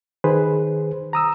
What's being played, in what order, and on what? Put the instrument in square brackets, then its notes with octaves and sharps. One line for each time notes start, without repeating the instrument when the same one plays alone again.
[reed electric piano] D#3 G#4 B4 C5
A#5 D#6 E6